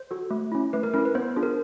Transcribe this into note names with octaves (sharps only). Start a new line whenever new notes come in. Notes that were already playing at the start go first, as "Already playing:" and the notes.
Already playing: C5
F#4 A4
A3
C#4 E4
A3 B4
A#4
C#4 E4 A#4
B4
B3 C5
D4 F4 G#4
A#4